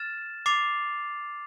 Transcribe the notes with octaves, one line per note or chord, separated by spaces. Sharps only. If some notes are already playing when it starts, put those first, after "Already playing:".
Already playing: F6 A6 E7
D6 A6 C7 F7